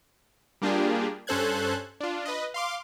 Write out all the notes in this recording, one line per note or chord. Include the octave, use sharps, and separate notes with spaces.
G3 A#3 D4 F4 G4 G#4
G2 C#4 A4 C5 F#6 G#6
D4 F4
B4 D#5
F5 C6 D6